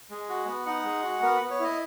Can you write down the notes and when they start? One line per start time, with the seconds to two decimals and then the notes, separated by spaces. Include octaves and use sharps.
0.10 G#3
0.29 F#4
0.47 B3
0.66 D#4 F#5
0.84 G#3
1.03 F#4
1.22 B3 A#4
1.36 B3 B4
1.50 C#5
1.59 E4 D#5